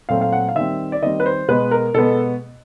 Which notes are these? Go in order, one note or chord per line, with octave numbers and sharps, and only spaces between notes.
A#2 F#3 A3 C4 F5
F5
F#5
F5
D#3 G3 C4 E5
D5
D#3 G3 C4 D#5
B4
C5
B2 G#3 B3 B4
A#4
B2 G#3 B3 A4